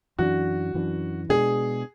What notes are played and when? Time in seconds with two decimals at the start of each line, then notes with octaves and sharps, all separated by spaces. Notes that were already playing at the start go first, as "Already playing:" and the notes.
0.18 F#2 E3 B3 D4 F#4
0.74 F#2 E3 B3 D4
1.29 B2 G#3 B3 D4 G#4